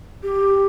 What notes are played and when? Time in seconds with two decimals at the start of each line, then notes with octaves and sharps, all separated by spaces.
0.23 G4